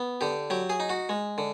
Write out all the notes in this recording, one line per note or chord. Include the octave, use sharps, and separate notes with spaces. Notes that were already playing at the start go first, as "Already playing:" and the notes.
Already playing: B3
D3 G4
F#3 G4
G#4
D#4
F#4
G#3
D3